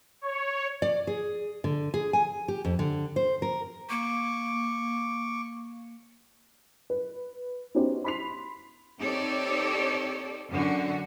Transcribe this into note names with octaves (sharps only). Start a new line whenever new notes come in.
C#5
D5
G#4
D3
G#4
G#5
G4
F2
D3
C5
A#4
A#3 C#6 D6
B4
B3 C#4 D#4 F#4 G4 C5
B5 C6 B6 C7 F7
C4 D#4 G4 A4 C#5 D5
F#2 D3 F#4